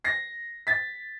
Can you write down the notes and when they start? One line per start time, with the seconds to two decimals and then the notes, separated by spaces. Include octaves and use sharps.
0.04 A#6 C7
0.67 A6 B6